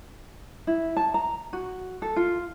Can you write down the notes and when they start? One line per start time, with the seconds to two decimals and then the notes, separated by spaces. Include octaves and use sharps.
0.67 E4
0.97 A5
1.14 A#5
1.53 F#4
2.02 A4
2.16 F4